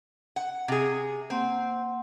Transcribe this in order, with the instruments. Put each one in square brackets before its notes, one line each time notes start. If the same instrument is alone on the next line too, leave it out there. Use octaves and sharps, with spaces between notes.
[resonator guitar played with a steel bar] F#5
C3 G#4
[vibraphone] A#3 F#5 C6 [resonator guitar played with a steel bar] C4